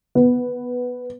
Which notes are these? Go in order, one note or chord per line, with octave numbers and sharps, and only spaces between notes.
B3